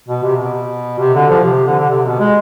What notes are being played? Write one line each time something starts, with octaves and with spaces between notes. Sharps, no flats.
B2
C3
B2
C3
D3
F3
C3
D3
D3
C3
B2
G#3